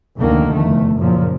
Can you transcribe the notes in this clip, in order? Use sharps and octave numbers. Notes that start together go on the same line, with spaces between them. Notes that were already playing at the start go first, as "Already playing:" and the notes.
F1 D2 D3 D#3 A#3
F1 E2 A3
F#1 F#2 A#2 F3